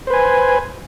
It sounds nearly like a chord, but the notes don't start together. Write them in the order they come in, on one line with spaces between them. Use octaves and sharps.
C5 B4 G#5